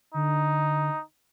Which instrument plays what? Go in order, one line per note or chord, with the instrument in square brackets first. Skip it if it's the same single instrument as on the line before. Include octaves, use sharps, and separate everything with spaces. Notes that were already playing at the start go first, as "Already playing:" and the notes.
[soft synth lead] D3 [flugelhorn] D#4